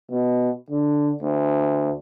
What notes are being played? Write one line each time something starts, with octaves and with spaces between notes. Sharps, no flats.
B2
D3
D2